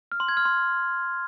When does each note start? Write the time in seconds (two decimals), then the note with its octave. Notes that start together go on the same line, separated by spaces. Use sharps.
0.12 F6
0.20 C6
0.28 G#6
0.37 F6
0.45 C6